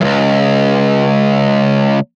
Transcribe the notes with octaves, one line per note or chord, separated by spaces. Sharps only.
C#2 F#2